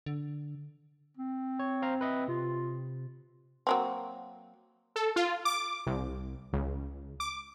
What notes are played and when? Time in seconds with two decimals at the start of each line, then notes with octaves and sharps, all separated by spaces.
0.06 D3
1.17 C4
1.59 C#5
1.82 C5 F5 A#5
2.01 B4 D#5 E5
2.28 C3 F4
3.67 F#3 A#3 C4
4.96 A4
5.16 F4
5.45 D6
5.86 C2
6.53 C#2
7.20 D6